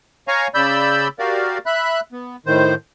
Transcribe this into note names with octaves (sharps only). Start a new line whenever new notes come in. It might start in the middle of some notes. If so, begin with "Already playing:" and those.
C#5 F5 G#5 A#5 C#6
C#3 D5 B5 E6 G6
F#4 G4 A#4 D5 F5
E5 B5 F#6
B3
A2 D#3 C5